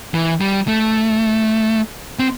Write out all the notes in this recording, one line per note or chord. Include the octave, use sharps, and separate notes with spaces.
E3
G3
A3
C4